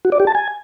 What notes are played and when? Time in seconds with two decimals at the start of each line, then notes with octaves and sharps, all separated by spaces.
0.05 F#4
0.12 D5
0.20 G4
0.27 A5
0.35 G#5